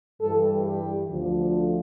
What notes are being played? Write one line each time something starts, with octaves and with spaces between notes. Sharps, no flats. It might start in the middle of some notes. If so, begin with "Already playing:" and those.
G2 E3 G3 A4
G4
D2 D3 F3